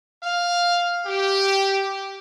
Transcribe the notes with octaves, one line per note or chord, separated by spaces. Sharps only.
F5
G4